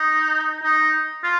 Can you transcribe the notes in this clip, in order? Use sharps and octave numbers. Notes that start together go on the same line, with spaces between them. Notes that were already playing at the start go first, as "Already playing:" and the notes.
Already playing: D#4
D#4
F4